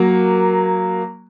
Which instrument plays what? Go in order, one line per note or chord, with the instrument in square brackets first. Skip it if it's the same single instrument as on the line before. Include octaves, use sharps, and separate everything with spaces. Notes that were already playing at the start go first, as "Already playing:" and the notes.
Already playing: [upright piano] F#3 A#3